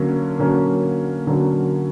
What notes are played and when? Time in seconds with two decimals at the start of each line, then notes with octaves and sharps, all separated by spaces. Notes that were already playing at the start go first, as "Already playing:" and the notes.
Already playing: D3 F#3 A#3 C#4
0.39 D3 F#3 A#3 C#4
1.27 D3 F#3 A#3 C#4